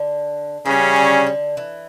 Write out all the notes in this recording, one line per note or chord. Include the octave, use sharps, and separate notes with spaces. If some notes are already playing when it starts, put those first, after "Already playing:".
Already playing: D3
C#3 E3 G3 C#4
D3
D3
E3